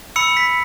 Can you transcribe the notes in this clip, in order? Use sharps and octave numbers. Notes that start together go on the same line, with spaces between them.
B5 E6 C#7
B6